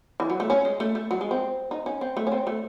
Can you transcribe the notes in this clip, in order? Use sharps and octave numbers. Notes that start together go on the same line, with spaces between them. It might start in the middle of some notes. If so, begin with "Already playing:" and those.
E3
F#3
A3
C#4
G#3
A3
A3
F#3
G#3
C4
D#4
C#4
C4
A3
C#4
C4
A3